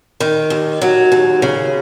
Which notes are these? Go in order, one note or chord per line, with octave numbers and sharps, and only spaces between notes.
D#3
D#2
F#3
D#2
C#3